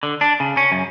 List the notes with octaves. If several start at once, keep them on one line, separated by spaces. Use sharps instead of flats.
D3
D4
C#3
C#4
F#2